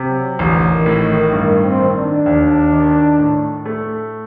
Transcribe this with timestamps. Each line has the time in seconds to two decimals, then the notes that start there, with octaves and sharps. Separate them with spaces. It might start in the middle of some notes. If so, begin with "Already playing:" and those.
Already playing: C3
0.08 F#3
0.39 A1 D3
0.71 D#3
0.86 A2
1.01 D#3
1.32 G2 D#3
1.63 C4
1.79 D#3
1.95 D4
2.26 D#2
2.72 D#3
3.19 A2
3.65 A3